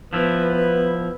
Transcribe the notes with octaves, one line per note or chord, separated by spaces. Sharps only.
F3 B3 E4 B4